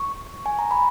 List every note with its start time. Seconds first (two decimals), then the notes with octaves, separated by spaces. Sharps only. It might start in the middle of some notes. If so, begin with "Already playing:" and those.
Already playing: C#6
0.46 G#5
0.59 A#5
0.71 B5